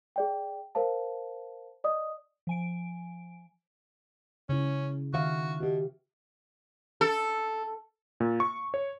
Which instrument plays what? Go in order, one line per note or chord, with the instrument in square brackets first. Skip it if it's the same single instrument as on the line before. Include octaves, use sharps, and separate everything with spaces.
[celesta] G#4 D5 G5
A#4 C5 F5 A5
D5 D#5 D#6
[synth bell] F3 G#5 D7
[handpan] C#3 E4 [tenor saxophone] C#4
[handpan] D#3 E5 F5 [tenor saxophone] F#4
[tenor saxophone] B2 [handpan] F#4 G4
[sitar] A4
[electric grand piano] A#2
C#6
C#5